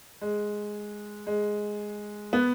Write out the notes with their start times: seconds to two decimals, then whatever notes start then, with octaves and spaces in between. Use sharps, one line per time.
0.21 G#3
1.27 G#3
2.33 B3